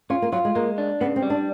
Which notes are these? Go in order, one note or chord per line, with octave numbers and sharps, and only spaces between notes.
C#4 F4
A#3
F#3 F4
G#3
G#3 A#3
D4
C#3 B3
C4
G3
D4